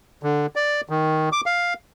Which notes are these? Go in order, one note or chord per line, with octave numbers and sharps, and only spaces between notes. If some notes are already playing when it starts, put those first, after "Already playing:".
D3
D5
D#3
D6
F5